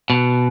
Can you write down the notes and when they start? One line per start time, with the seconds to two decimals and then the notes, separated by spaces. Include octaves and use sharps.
0.10 B2